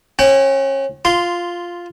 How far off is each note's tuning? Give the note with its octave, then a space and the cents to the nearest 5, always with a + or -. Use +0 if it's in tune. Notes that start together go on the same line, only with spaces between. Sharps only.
C#4 -30 F#5 +45
F4 +0 C6 -10